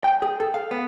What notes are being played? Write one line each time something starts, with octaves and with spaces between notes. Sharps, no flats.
G5
G#4
A4
F5
B3